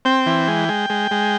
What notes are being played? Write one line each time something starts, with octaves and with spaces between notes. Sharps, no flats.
C4 G5
E3
G#3
G#3
G#3
G#3